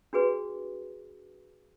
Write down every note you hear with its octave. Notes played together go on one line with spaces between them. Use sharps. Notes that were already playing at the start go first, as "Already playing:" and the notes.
D4 F#4 G#4 B4